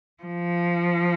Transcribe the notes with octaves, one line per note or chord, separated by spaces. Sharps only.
F3